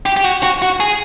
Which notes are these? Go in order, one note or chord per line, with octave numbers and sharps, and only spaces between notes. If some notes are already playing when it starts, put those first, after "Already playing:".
G4
G4
F#4
F#4
F#4
G#4